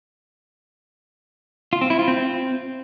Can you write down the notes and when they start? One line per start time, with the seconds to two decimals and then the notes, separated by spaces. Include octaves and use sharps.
1.73 F4
1.81 C4
1.90 E4
1.99 F4
2.08 C4